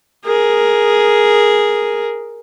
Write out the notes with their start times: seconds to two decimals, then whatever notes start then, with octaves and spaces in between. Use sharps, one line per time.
0.25 G#4 A#4